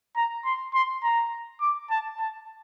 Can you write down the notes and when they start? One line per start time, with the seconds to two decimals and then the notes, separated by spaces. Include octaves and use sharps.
0.16 A#5
0.45 C6
0.74 C6
1.03 A#5
1.61 D6
1.91 A5
2.20 A5